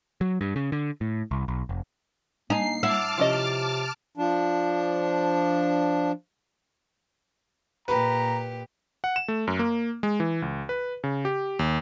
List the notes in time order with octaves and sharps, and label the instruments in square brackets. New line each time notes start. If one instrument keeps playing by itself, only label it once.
[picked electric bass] F#3
G2
C#3
D3
A2
C2
B1
F1
[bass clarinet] A#3 [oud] D#4 [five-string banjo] G#5 A5 [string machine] C7
[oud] E4 [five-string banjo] F#5 [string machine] A5 D6 F6
[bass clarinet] C3 [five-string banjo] F3 C#4 D#5
[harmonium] F3 D4
[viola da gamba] A#2 G4 [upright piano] B4 [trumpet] A#5
[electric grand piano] F#5
E7
A3
F#2
A#3
G#3
E3
C#2
B4
C#3
G4
D#2